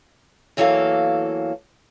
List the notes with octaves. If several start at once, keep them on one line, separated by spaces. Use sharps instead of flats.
E2 E3 F#3 A#3 A4 F5